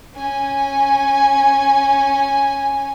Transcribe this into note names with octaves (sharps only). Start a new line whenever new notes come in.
C#4 G#5